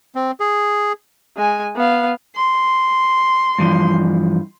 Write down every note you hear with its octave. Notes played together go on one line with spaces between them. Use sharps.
C4
G#4
G#3 G#5
B3 F5
C6
G2 E3 F3